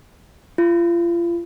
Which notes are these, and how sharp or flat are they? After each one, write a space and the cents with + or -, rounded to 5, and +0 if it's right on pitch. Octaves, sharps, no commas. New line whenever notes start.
F4 -35